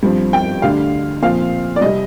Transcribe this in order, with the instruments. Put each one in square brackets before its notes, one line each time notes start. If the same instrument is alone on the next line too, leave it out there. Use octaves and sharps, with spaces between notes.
[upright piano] G2 F3 C4
G5
D2 D3 G3 D4 F5
A#2 F3 C4 F5
D5
C2 C3 G3 D#5